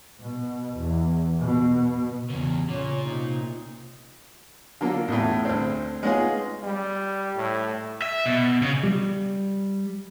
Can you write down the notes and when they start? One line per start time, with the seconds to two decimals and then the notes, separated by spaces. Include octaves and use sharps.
0.20 B2
0.77 E2
1.40 B2
2.30 E2 C#3
2.69 A#2 C#3 C#4
3.08 C3 D#4
4.81 D3 F#3 A#3 F4
5.08 A1 E2 A2
5.45 D2 C4
6.03 G#3 B3 C#4 D#4 F4 G#4
6.63 G3
7.36 A2
8.02 E5
8.26 B2
8.62 C#3
8.83 G3